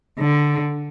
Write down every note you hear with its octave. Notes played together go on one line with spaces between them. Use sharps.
D3